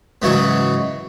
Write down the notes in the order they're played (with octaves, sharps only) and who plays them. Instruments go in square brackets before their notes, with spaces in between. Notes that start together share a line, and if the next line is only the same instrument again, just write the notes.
[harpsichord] G#2 C#3 E3 F#3 F#4